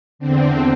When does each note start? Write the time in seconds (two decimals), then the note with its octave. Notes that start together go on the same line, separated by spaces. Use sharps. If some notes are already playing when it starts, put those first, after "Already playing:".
0.19 E2 D3 C4